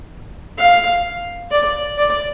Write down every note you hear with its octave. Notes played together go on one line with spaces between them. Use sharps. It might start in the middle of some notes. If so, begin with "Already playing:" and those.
F5
D5
D5